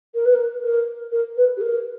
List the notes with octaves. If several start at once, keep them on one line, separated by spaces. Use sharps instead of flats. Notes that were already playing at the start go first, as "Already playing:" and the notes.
A#4
B4
A#4
A#4
A#4
B4
G4
A#4